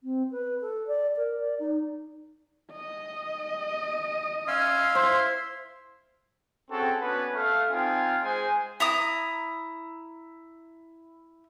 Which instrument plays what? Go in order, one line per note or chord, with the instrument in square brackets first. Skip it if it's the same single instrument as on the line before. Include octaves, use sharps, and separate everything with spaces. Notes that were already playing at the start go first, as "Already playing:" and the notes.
[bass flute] C4
B4
A4
D5
A#4
D5
D#4
[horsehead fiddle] D#5
[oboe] C#4 [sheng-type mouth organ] E5 F5 C6
[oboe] E4 [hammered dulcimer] C5
[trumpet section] C4 C#4 F#4 G#4 A4
B3 C#4 D4 F#4 B4
A3 F5
C4 D#4 F4 F5 G#5
G#3 C5 G#5
[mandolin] E4 A#5 D#6